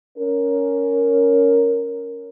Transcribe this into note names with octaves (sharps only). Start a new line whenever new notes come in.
C#4 A#4